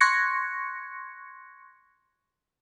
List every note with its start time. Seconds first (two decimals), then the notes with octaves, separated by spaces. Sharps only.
0.01 C6 C#6 F#6 G#6 A#6 C#7